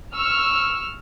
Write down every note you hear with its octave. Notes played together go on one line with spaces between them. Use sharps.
C#6 E6 F6